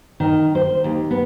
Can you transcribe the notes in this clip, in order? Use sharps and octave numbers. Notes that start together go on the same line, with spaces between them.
D#3
C5
D#2
B3